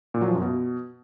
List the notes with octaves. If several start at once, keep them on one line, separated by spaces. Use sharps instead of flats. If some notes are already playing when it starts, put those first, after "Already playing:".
A#2
F#3
F3
F#2
B2